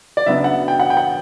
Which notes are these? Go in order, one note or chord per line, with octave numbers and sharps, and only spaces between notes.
D5
C#3 F#3 B3 D4 E5
F#5
G5
F#5
G5
F#5